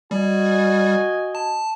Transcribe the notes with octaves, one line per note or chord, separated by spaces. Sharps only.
G3 F#4 D#5 G#5
A5